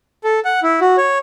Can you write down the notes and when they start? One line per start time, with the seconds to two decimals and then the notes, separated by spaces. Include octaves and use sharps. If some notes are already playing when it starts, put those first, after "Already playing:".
0.24 A4
0.45 F#5
0.63 E4
0.81 F#4
0.97 C#5